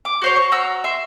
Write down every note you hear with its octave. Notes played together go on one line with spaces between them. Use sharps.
D6
F#4 C5 C#5
C#6
F#4 A#5 E6
E5 C6